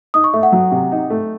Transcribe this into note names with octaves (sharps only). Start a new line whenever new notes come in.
D#4 D#6
C#6
A3 E5
F#5
F#3
C3
D#4
A3